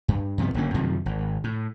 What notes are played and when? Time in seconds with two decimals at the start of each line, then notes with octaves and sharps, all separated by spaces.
0.08 G2
0.38 G2 C3 F3 B3
0.54 F#1 D3 A#3 C#4
0.74 F#2 C3 D#3 F3
1.06 G#1
1.44 A2